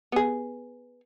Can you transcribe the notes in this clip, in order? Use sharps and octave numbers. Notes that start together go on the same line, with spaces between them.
B3 G#4